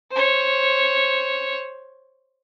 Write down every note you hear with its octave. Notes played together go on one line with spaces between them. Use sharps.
C5 C#5